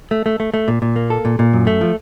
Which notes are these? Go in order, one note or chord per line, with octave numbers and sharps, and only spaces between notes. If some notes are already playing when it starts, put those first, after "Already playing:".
A3
A3
A3
A3
A#2
A#2
A#3
A4
A#2
A#2
F#2
A3
F3